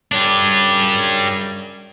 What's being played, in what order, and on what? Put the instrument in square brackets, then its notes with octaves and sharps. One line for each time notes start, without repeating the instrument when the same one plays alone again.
[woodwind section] F#2 C#3 G3 [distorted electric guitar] D4 G4